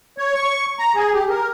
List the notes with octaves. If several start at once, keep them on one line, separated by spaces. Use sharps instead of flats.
C#5
C#6
A#5
G#4
G4
A#4